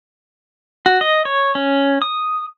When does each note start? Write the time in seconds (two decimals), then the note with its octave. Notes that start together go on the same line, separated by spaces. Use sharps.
0.86 F#4
1.01 D#5
1.25 C#5
1.55 C#4
2.02 D#6